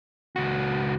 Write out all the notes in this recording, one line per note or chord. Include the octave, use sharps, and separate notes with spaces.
C#2 F#4